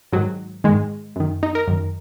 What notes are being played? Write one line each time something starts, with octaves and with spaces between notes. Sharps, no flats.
G#2 D#3 F#3
G#2 D#3 G#3
F#2 D#3
D#4
A#4
F#2 D#3